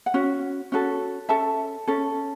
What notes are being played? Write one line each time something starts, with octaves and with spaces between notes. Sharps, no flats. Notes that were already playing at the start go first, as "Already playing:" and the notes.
F#5
C#4 F#4
C#4 F#4 A4
C#4 A4 E5 A5
C#4 A4